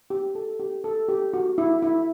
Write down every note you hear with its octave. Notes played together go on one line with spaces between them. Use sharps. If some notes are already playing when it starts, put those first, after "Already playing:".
G4
A4
G4
A4
G4
F#4
E4
E4